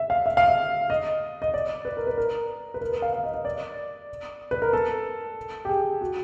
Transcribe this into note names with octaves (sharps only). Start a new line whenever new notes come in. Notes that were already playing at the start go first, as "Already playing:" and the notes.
Already playing: E5
F5
E5
F5
E5
D#5
D#5
D5
B4
A#4
B4
A#4
B4
A#4
B4
F5
F5
D#5
D#5
D5
B4
A#4
A4
G4
G#4
F#4